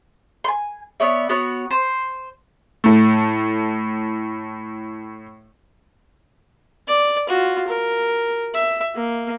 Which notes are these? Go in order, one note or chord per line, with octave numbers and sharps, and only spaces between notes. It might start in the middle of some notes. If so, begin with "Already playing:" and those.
G#5 C6
B3 C#5 D5 E5
B3 F#4 C#5
C5
A2 A3
D5
F4 F#4
A#4
E5
A#3